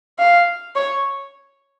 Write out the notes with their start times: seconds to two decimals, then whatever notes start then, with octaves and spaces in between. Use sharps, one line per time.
0.19 F5
0.75 C#5